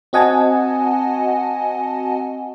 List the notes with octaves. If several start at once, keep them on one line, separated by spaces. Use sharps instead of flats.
C4 F#4 D#5 F#5 G#5 A5